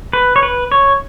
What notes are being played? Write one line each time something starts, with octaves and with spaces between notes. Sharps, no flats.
B4
C#5
B4
C#5